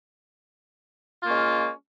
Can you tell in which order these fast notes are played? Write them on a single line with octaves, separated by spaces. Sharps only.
F4 A#3 C#4 G#3